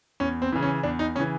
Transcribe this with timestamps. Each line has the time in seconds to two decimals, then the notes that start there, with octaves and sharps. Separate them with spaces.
0.20 E2 C#4
0.42 C4
0.52 C#3 E3
0.62 C#4
0.83 E2 D4
0.99 D#4
1.15 C#3 C#4
1.20 E3